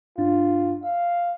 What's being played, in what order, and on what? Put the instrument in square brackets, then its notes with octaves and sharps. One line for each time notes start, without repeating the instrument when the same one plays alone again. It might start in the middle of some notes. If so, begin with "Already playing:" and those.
[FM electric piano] G2 D4 [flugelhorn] F4
[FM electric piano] E5 [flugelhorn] F5